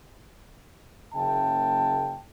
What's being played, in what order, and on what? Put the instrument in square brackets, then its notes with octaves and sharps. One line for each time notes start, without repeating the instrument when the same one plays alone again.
[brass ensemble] F#1 C#3 A#3 E5 G5 A5